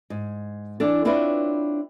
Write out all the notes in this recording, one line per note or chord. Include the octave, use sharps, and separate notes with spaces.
G#2
E3 D4 A4
C4 D4 E4 F4 B4 C#5